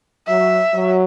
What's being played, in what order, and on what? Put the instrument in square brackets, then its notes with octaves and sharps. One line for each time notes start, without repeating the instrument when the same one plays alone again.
[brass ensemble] F#3 [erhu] E5
[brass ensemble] F#3